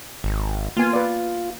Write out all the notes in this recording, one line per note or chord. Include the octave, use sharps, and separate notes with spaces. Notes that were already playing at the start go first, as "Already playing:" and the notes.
G#1
A#3 B3 F4 G#5
B4 D5